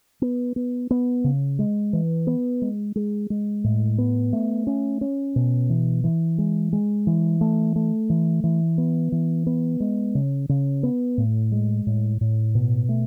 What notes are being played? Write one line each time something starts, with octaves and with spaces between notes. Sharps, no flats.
B3
B3
B3
C#3
G#3
E3
B3
G#3
G#3
G#3
A2
B3
A3
C#4
C#4
B2
E3
E3
G#3
G#3
E3
A3
A3
E3
E3
B3
E3
B3
G#3
C#3
C#3
B3
A2
G#3
A2
A2
B2
A3